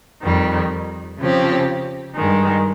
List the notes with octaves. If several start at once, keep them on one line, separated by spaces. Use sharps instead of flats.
F2 D#3 G3
C#3 F3 C4 G4
G2 D#3 G#3